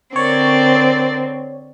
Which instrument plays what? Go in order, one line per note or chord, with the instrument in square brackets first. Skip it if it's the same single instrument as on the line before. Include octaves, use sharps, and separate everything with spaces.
[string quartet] D3 C4 [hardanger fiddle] A#4 D5 [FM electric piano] C#5